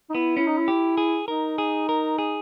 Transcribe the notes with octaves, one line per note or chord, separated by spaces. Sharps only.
D#4
B3 E4
C#4 E4
D#4
E4
G4
G#4
D#4 A#4
G#4
A#4
G#4